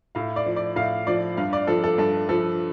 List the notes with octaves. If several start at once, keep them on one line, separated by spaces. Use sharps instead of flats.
A2 F5
D5
F3
D5
A2 F5
F3 D5
G2 F5
D5
F3 A4
A4
G2 A4
F3 A4